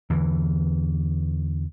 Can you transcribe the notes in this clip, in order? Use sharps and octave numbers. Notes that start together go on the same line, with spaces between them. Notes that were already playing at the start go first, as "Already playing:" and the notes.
E2 D3 E3